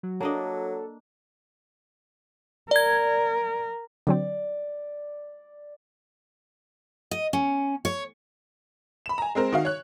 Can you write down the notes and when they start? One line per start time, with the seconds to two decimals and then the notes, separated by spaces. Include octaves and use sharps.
0.03 F#3
0.21 F#3 A#3 D4 A4 D#5
2.71 A#4 D5 G#6
4.07 D3 F#3 C4 D5
7.11 D#5
7.33 C#4
7.85 C#5
9.06 B5 E7
9.18 G#5 A#5
9.35 G#3 C4 A#4 C5
9.52 D#3 F#4 F5
9.65 C#5 F#6